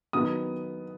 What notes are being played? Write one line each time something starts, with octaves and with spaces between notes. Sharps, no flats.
D#3 F#3 B3 D#4 D#6